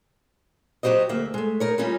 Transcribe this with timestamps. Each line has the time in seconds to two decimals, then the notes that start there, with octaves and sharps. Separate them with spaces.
0.83 F#3 F#4 G4 C5 D#5
1.09 D2 A#3 E5
1.34 G#3 A3
1.60 D#4 A#4 C#5
1.78 E3 G3 C#4 D#4 F4